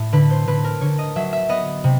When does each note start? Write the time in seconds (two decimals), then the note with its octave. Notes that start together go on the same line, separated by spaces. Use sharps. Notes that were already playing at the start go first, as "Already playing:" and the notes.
Already playing: A2
0.13 D3 B4
0.30 C5
0.47 D3 B4
0.64 A#4
0.81 D3 C#5
0.99 D#5
1.16 F#3 E5
1.33 E5
1.49 B3 D#5
1.84 C3